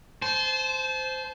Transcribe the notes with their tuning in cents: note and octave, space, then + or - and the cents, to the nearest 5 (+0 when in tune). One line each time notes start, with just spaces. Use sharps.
C5 -10 A5 -35